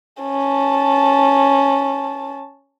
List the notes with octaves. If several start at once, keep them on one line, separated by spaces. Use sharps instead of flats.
C#4 A5